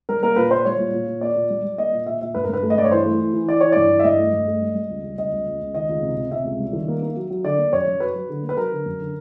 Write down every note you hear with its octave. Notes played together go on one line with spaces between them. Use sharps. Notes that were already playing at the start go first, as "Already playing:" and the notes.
G3 A#4
A#3 A#4
A#2 B4
A#2 C5
G3 C#5
A#2
A#2
A#2
A#3 D5
A#2
G3
G3
A#3 D#5
A#2
A#2 E5
A#2 E5
G2 B4
A#4
G2 B4
A3
D#5
G2 D5
C#5
E3 C5
A3
E3
E3
E3 D5
E3 C#5
G2 D5
E3
E5
G2 D#5
A3
G2
A3
G3
G3
C#2
G3
C#2 D#5
C#2
C#2
C#2
D#3 D#5
C#2
C3
C3
C3 E5
C#2
G3
D#3
A#3
A#3
F#3
F#3
D3 D5
A#3
F#2 C#5
F#2
F#3 B4
F#3
D3
A#3
B4
F#3 A#4
D3
F#2
D3